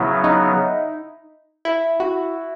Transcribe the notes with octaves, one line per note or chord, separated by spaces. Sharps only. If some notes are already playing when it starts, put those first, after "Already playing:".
Already playing: C#3 F#3 B3 E4
D#4
E4
F#4